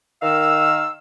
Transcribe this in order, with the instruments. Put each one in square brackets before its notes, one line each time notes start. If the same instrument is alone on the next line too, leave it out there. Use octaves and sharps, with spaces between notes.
[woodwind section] D#3 F5 E6